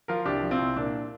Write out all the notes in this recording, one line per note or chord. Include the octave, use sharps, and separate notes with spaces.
F3 F4 A#4
C2 D4 G4
F3
C4 F4
C2
A#2 D4